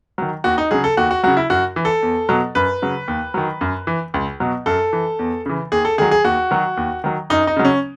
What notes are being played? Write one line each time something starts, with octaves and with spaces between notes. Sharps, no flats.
D#3 F#3
D#2 F#4
D#4
C#3 F#3 G#4
A4
D#2 F#4
F#4
C#3 F#3 F#4
E4
F#2 F#4
E3
A4
E2
B2 F#3
F#2 B4
C#3 F#3
D#2
D#3 F#3
F#2
E3
C#2
B2 F#3
F#2 A4
E3
E2
C#3 E3
D#2 G#4
A4
D#3 F#3 G#4
G#4
D#2 F#4
D#3 F#3
D#2
D#3 F#3
F#2 D#4
D#4
C#3 F#3
C#4